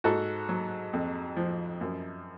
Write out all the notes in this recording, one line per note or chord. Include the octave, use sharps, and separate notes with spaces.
G#2 F#4 A4
F#3
F2
F3
F#2